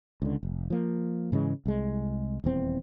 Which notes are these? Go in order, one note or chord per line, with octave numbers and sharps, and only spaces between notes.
C#2 D3
F1
F3 A#3
G#2 C#3 E3 G#3
C2 G#3
D#1 E2 C4